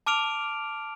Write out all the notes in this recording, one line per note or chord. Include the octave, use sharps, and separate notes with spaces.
A5 D6 F6 D7 F7